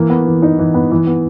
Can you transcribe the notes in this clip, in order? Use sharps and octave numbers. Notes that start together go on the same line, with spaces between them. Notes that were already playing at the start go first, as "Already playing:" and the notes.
Already playing: E3 A#3
B3
E3
D#4
E3
B3
E3
B3